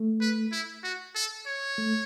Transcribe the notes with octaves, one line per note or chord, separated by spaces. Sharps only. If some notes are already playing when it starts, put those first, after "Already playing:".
Already playing: A3
B4
E4
F#4
A4
C#5
A3